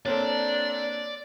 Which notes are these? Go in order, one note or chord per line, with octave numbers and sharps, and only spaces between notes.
A#3 C4 D4 A4 C#5 D5